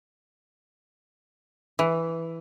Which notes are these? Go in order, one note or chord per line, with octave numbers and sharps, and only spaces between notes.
E3